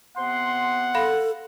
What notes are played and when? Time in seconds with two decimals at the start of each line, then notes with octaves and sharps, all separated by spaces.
0.17 C3 B3 F#5 C6
0.95 A4 F5 B5